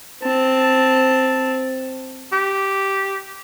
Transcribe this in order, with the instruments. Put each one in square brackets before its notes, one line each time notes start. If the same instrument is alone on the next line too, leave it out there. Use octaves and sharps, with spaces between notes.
[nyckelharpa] C4 A5
[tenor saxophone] G4